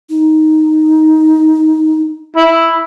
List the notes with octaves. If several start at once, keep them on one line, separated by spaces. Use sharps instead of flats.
D#4
E4